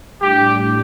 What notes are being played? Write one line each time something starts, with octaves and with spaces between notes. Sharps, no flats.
A2 G3 D4 G4